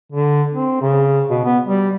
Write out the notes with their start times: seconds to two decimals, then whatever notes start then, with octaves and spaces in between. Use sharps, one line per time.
0.12 D3
0.53 C4
0.82 C#3
1.30 B2
1.45 B3
1.67 G3